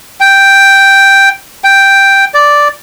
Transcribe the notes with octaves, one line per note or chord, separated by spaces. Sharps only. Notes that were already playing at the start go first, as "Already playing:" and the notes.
G5
G5
D5